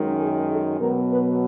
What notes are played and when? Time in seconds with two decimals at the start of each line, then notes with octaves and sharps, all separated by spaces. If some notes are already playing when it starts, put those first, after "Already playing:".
Already playing: F#2 D#3 G#3
0.20 G#4
0.50 A4
0.79 B2 F#3 B3 A#4
1.10 B4